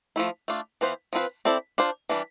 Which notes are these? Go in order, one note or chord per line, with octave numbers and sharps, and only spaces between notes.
F3 A3 E4
A3 D4 F4
E3 B3 F4 C5
F3 C4 F4 B4
C4 E4 A4 D5
D4 F4 C5
E3 G3 D4